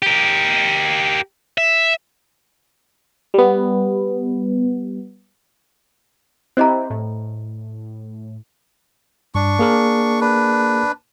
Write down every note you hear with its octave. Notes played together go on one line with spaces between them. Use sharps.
G4 A#4
E5
G3 B3
C4 E4 G4 C5 D#5 A#5
A2
G2 D4 C#6
A#3 G#4 A#4
D4 B4